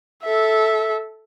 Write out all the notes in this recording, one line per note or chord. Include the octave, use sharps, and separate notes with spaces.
A4 E5